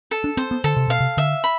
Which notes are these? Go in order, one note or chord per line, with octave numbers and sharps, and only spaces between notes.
A4
D4
C4 C5
B3
D3 A4
C3
B2 F5
C3
D3 E5
B5